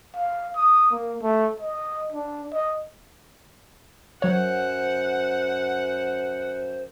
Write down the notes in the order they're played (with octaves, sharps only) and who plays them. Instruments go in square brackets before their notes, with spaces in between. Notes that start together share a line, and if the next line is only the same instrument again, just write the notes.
[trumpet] F5
D#6
A#3
A3
D#5
D4
D#5
[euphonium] F#2 [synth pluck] F#3 C#5 [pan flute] C5 [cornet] F#5